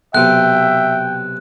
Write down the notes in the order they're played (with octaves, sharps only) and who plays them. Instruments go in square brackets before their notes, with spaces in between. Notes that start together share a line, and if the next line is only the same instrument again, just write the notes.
[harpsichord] B1 C3 [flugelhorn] E5 [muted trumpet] G5 [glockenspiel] F#6